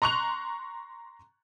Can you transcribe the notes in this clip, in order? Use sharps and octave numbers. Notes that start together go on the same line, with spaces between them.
A#5 C6 C#6 F#6 F7